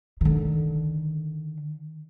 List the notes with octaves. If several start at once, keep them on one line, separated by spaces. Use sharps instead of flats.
D3 D#3